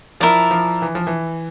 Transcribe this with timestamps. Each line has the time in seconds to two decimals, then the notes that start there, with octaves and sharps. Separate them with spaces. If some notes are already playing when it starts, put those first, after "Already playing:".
0.20 F3 E4 A#4 D5
0.51 F3
0.82 E3
0.95 F3
1.07 E3